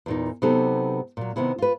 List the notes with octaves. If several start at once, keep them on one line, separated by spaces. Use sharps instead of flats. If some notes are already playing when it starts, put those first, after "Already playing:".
E2 A#2 D#4
C3 F#3 B3 D#4 G4 A4
A#2 F#3
C3 D#3 B3 E4
F4 B4